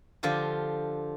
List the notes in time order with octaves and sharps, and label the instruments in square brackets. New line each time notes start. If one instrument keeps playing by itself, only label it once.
[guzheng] D3 F3 F4 G4